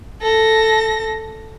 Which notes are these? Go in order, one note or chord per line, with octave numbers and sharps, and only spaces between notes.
A4 A#6